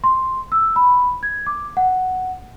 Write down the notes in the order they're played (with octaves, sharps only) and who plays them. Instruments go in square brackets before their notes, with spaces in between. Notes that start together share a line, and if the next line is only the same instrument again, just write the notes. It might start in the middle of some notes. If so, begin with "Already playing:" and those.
[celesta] C6
E6
B5
G#6
D6
F#5